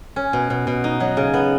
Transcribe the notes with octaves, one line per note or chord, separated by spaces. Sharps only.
C#4
B2
B2
B2
D#4
F#3
C#3
B3